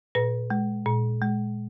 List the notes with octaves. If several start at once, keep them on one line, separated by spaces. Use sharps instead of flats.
A#2 B4
G#3
A#2
G#3